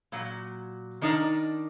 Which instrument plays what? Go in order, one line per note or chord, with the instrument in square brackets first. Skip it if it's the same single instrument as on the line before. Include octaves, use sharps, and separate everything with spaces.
[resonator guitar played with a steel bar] A#2 F#3
D#3 D4 D#4 A#4 D5